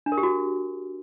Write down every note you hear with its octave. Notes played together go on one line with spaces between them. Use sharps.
D4
A#4
G4
F#4